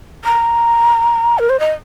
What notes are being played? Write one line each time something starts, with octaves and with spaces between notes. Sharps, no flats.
A#5
A#4
C5
D#5